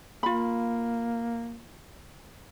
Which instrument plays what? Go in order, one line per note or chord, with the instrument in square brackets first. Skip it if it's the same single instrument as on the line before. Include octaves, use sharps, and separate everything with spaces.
[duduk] A#3 [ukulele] F4 B5